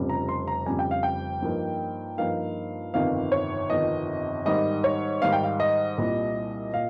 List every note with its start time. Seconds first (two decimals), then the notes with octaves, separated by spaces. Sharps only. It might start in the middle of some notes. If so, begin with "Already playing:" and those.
Already playing: F1 F2 C#3 G3
0.10 A#5
0.29 C6
0.48 A#5
0.66 F1 F2 C#3 G3 G#5
0.79 G5
0.91 F5
1.03 G5
1.42 G2 F3 A#3 D#4
2.18 G2 F3 A#3 D#4 F5
2.94 G1 F2 C3 D#3 F5
3.32 C#5
3.70 G1 F2 C3 D#3 D#5
4.46 G#2 D#3 G3 D#5
4.84 C#5
5.22 G#2 D#3 G3 F5
5.32 G5
5.43 F5
5.60 D#5
5.98 C2 A#2 G3
6.74 A#2 F5